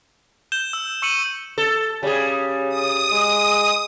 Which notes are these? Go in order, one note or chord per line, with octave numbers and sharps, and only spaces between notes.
G6 E7 G7
E6
C#6 E6 C#7 D#7 F#7
A4
C#3 G3 G#4
D#6
G#3